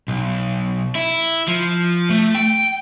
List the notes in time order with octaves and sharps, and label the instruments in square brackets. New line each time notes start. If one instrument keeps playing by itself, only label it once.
[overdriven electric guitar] B1
E4
F3
A3
G5